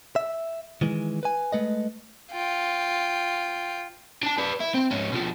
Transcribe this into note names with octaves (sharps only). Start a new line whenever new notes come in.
E5
D#3 E3 G#3
B4 G#5
G#3 A3 B4 D#5
F4 G5
D4 A5
B4 D5
E4
C4
G#2 C#4
B2 F3